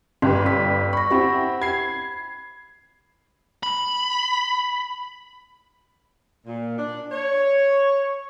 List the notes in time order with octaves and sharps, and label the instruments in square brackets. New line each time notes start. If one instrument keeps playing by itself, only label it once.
[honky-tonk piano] G1 G4 B4 [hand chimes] C6
[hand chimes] C#4 E6 B6
[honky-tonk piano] B5 [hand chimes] C#6 A#6
[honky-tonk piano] C4 E4 [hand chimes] G4 F#5 B5
[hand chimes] B5 [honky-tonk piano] G#6 C7
[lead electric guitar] B5
[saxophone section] A#2
D4
C#5